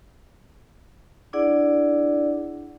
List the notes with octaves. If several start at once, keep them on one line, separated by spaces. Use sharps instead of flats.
D4 E4 G#4 D5 F#5